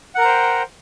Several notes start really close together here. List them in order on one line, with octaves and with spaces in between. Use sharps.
F#5 A#4 A#5 C5 G5